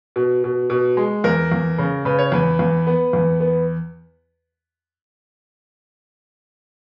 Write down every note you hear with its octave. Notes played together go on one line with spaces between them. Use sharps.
B2
B2
B2
G#3
E2 A#4
E2
C#3
C#3 B4
C#5
E2 B4
E2
B3
E2
B3